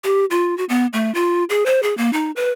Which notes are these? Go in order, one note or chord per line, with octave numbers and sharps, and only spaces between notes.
G4
F4
F#4
B3
A3
F4
G#4
C5
G#4
A#3
D#4
B4